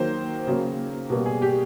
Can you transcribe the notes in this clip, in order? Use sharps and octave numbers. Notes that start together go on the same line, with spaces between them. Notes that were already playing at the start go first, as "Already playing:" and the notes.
Already playing: D#3 F#3 A#3 C5
C#3 F#3 A#3
B2 G3 A#3
G#4
G4